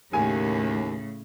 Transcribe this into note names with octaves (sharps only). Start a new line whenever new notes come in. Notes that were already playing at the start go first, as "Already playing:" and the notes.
D#2 A2 C#3 G#5